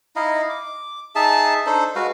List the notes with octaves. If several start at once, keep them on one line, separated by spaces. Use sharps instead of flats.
D#4 E4 D#5 F5
D6
D#4 G#4 E5 A5
D4 D#4 A4 C5
G#3 F#4 B4 F5